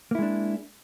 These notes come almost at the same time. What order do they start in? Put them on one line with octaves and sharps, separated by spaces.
A#3 E4 G#3 D4